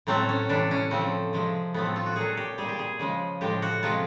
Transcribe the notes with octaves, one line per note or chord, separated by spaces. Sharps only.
A2 F#3 A3 C4
C#4
C3 E3 A3 D4
C#4
C#3 F3 A3 C4
C3 F3 G#3
A2 F3 A3 B3
C4
F4
F#4
A#2 F#3 A3 G#4
G4
A#2 G3 G#4
G4
G#4
C#3 F3 G#3
A2 F3 G#3 G4
F#4
C3 F3 G#3 F4